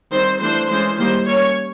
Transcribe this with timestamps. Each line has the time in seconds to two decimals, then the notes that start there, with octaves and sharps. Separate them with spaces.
0.11 D#3 G3 C4 C5
0.40 E3 A3 D4 C5
0.69 E3 G#3 C#4 C5
0.98 D#3 G3 A#3 C5
1.26 G3 A#3 C#4 C#5